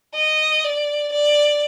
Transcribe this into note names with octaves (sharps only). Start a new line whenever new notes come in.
D#5
D5
D5